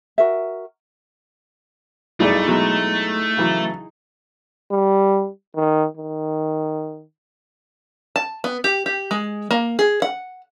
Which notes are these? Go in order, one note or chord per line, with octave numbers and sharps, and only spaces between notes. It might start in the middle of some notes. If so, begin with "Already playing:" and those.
F#4 A#4 E5
B1 G2 A3 D#4 E4 G#4 D5
B2 F#3 G#3
C#3 E3 F#3
G3
D#3
D#3
A5
B3
G4
G4
G#3
A#3
G#4
F#5